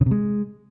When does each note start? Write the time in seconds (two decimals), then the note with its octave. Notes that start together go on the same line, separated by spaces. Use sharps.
0.01 C#3
0.06 C3
0.11 G#3